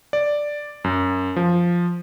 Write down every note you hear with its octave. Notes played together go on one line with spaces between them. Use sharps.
D5
F#2
F3